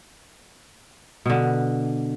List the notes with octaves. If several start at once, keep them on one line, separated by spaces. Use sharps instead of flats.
B2 D3